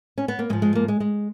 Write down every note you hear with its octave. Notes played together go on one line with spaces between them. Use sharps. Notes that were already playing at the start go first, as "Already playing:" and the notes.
C#4
B3
A#3
G#2 F3 G#3
G#3
A#3
G#3
G#3